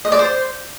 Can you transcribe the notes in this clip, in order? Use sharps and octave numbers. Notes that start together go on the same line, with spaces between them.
D#5
D5
C5